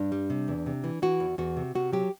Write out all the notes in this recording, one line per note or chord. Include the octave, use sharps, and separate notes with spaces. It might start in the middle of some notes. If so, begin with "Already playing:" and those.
Already playing: G2 D4
G3
C3
E2
C3
E3
E3 F#4
E2
E2 F#4
C3
C3 F#4
F#3 G4